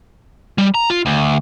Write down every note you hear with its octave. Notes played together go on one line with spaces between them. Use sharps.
G3
A#5
F4
D2